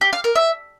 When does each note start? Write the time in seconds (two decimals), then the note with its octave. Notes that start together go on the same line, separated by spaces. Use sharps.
0.01 G4
0.13 F5
0.24 A#4
0.35 E5